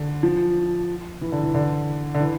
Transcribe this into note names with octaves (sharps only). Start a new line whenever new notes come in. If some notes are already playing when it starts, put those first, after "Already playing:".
Already playing: D3
F3
E3
D3
E3
D3
D3
E3